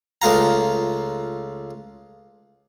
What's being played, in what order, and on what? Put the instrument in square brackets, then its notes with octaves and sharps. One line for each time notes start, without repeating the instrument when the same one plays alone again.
[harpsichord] C#2 A3 F4 A#5